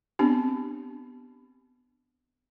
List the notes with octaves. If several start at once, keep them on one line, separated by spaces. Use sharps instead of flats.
B3 C4 D4 G4